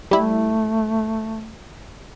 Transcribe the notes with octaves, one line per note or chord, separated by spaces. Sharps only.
G3 A3 E4